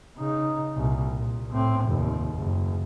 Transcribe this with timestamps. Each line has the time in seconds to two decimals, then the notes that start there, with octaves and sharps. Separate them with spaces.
0.17 C#3 D#4
0.76 C2 A#2
1.16 A#2
1.53 A2 C4
1.85 F1 D#2
2.34 F#1